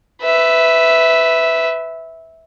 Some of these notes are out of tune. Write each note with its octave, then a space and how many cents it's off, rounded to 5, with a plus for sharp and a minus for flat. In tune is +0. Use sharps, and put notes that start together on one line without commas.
B4 +15 E5 -5